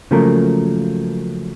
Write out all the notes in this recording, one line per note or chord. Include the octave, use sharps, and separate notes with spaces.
C#3 F3 F#3 A3 A#3 A#4